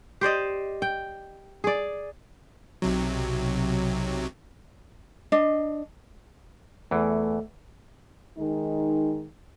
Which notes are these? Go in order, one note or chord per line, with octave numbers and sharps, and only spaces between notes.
G4 C5 D5 D#5
G5
G#4 D5
B1 C3 F#3
D4 D#5
E2 E3 A3
D#3 G#3 D#4